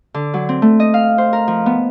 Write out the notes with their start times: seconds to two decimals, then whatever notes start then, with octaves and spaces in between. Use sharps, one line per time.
0.14 D3
0.34 F#3
0.49 C4
0.62 A3
0.80 D#5
0.94 F5
1.18 C5
1.33 A#4
1.48 F3
1.66 B3